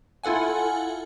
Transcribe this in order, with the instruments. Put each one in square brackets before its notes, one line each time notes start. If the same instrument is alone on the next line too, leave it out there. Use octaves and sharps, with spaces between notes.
[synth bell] E4 F4 A4 F#5 G#5